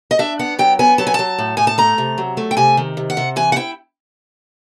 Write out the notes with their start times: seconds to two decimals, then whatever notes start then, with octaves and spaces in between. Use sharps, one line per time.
0.11 D#5
0.19 D4 E5
0.39 B3 F#5
0.59 F#3 G5
0.79 B3 G#5
0.98 F#3 A5
1.07 G#5
1.14 F#3 A5
1.38 A2
1.57 A2 G#5
1.67 A5
1.78 A3 A#5
1.98 C3
2.18 F#3
2.37 A3
2.51 G5
2.57 C3 G#5
2.77 D#3
2.97 C3
3.10 F#5
3.17 C3
3.36 E3 G#5
3.52 F#5
3.56 E4 G5